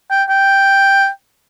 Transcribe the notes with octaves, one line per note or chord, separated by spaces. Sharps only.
G5
G5